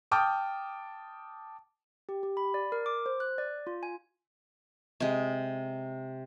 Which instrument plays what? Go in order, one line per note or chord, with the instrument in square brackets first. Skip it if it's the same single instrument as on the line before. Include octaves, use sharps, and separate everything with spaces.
[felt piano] G5 A5 D6 D#6 F6 G6
[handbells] G4
G4
B5
D5
A#4
D6
C5
F#6
D5
F4
G#5
[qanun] C3 G#3